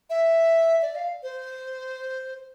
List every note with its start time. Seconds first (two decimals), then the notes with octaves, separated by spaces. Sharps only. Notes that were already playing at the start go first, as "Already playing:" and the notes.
0.10 E5
0.82 D5
0.95 F5
1.23 C5